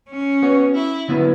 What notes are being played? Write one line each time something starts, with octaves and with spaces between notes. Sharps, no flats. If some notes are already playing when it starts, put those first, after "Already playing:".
C#4
B3 F#4 C#5
E4
D3 F#3 B3 E4 B4